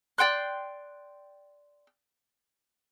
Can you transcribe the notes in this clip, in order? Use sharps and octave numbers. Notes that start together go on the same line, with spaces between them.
D5 G5 C6 F#6